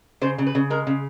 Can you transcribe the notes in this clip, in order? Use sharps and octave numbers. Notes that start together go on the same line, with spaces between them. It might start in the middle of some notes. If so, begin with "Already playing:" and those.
C#3 C5
C#3
B4
C#3
G#3 A#4
C#3